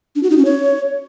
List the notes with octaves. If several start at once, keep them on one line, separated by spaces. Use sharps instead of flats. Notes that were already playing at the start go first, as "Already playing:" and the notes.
D4
F#4
D#4
C#4
C#5